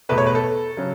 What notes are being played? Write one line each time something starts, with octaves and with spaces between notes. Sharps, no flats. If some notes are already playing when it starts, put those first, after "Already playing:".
E2 B2 A3 B4
C#5
B4
A4
C#3 F#3